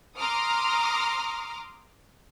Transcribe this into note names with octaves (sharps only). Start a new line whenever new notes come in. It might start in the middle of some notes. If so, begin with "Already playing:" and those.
A#5 C6 D6 D#6 F6